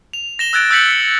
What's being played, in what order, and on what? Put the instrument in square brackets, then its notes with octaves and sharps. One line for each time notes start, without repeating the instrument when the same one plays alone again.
[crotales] F7
A#6 E7 G7
E6 F#6 G#6 A6 D7
E6 G6 A6 B6 C#7 F#7